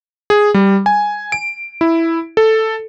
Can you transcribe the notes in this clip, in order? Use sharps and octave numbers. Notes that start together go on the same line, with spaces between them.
G#4
G3
G#5
D7
E4
A4